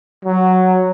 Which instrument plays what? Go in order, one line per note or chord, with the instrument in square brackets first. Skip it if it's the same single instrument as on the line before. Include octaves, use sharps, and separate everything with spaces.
[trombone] F#3